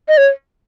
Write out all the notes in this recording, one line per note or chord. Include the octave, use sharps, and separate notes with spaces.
D#5
C#5